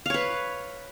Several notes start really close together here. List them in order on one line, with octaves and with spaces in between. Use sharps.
F5 C#5 B4